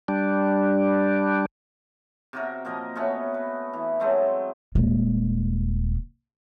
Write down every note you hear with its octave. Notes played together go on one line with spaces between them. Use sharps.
G3 D4
C3 F#4 A#4
A#2 F3 A#4 D#5
A3 B3 C#4 F#4
B4
E3
F#3 G#3 A3 C4
D#1 G#3